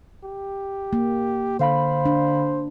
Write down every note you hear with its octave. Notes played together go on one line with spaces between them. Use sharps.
G4
A#3
D3 C5 F5 B5
D4